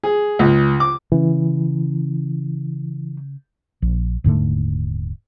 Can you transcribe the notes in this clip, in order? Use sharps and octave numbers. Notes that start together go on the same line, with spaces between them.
G#4
C#2
D6
C#3 E3 C#4
A#1
D#1 G#2 D3 A3